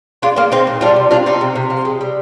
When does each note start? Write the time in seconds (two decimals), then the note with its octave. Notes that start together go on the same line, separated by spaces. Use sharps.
0.22 G#3 D4 F4
0.36 G#3 A#3 D4
0.51 G#3 C4 D#4
0.67 A#2
0.81 G3 D4 F4
0.96 C3
1.11 C3 D4 F4
1.26 G3 C4 D#4
1.41 C3
1.56 C3
1.70 F3
1.85 G#3
2.01 G3